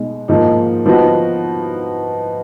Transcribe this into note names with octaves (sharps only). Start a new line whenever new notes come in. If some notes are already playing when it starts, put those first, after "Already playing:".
Already playing: B2 G#3 D#4
G#2 F3 A#3 D#4
F3 B3 D#4 F#4